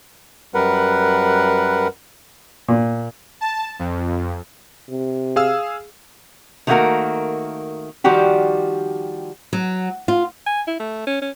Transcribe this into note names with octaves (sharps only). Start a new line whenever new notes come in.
F#2 G3 A#4 B4 F#5
A#2
A5
F2
C3
G#4 F5 E6
D#3 A3 A#3 C#4 F#4 A#4
D#3 F3 G3 F#4 G4
F#3
F4
G#5
E4
A3
C#4
C#4